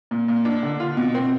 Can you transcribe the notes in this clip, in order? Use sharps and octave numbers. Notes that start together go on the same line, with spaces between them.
A#2
A#2
D4
D3
F4
B2
C4